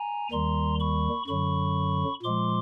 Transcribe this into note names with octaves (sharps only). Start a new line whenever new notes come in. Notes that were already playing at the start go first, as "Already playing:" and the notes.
Already playing: G#5 A#5
D#2 D#3 G3 A#5 C6
B5 C#6
F#2 D3 F#3 B5 C#6
A#2 F3 G#3 C6 D6